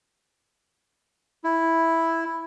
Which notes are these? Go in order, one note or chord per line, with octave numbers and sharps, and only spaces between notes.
E4